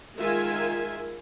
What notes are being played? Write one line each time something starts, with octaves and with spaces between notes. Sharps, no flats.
D#3 G#3 F4 A#4 E5 G#5